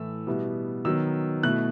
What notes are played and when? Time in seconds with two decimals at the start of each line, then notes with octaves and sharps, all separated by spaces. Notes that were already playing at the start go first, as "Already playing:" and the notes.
Already playing: A2 E3 A3 E6
0.27 B2 G3 B3 E4
0.85 D#3 F#3 B3 E6
1.43 B2 A3 E4 F#6